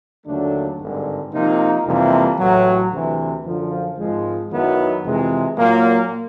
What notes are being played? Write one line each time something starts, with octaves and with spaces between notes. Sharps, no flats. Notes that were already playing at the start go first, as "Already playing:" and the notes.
D#2 D3 F#3 A3 D4
G#1 G2 D3
C3 F3 A#3 D#4
F2 C3 E3 G3 A#3
A1 A2 F#3
D2 C3 E3
F#2 D3 F3
G#1 G#2 F3 G#3
F#2 D#3 F#3 B3 E4
F2 C3 E3 G#3
A#2 F#3 A#3